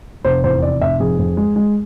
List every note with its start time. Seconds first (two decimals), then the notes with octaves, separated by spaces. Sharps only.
0.25 F1 C5
0.44 E2 C5
0.62 F1 D5
0.81 F1 E5
1.00 F2 G#4
1.19 F2
1.37 G#3
1.56 G#3